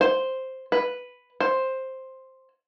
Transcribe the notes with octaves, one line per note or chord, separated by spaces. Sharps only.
C5
B4
C5